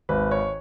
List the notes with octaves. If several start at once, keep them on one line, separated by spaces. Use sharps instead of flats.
G#1 B4
C#5